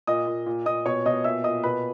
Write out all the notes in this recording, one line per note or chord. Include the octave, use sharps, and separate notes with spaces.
A#2 D#5 D#6
A#2
A#2
A#2 D#5 D#6
B2 C#5 C#6
B2 D#5 D#6
A#2 E5 E6
A#2 D#5 D#6
B2 B4 B5